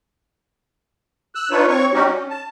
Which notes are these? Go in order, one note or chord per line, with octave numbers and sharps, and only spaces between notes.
E6 F#6
D4 D#4 F4 B4 C#5
C4 C#5 C#6
G3 C#4 D#4 F#4 G4
C#4
A5